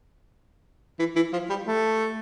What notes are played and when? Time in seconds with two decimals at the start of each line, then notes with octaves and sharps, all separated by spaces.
0.99 E3
1.16 E3
1.33 F3
1.49 G3
1.67 A3